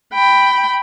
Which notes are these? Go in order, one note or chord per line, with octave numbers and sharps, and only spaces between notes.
G5 B5